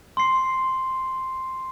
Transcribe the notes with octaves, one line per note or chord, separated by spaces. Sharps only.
C6 C7